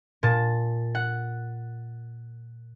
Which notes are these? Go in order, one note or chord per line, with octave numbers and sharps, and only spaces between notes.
A#2 A5
F#5